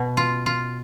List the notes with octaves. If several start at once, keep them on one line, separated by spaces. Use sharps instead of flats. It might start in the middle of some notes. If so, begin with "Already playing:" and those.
Already playing: B2
F4
F4